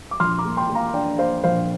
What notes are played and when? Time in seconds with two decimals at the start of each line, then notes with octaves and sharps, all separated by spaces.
0.11 D6
0.20 A#1 C6 F6
0.38 A#5 D6
0.45 A#3
0.57 G5 C6
0.69 A#3
0.75 F5 A#5
0.94 D4 D5 G5
1.18 A#3 C5 F5
1.43 A#1 C5 F5